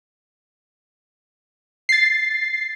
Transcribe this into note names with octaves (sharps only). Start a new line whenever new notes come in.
A6 C7